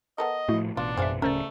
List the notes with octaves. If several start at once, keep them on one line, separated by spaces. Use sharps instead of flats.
B3 A4 A#4 D#5
A2 F3 A3 E4 F#4
A1 B2 D4 F4
F#2 G#3 C5 E5 F5
D1 C#3 A3 C#4 A#4 C5 D5